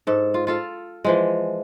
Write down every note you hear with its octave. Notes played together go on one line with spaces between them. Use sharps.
G#2 A4
F4
F4 A4 F5
E3 F3 G#3